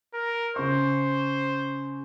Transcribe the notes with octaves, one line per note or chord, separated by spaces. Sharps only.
A#4
C#3 C5 C#6